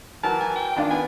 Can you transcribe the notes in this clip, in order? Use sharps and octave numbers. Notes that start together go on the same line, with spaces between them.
E3 F#3 A#4 A5
G#5
G5
D#3 D4 F4
B3 G#5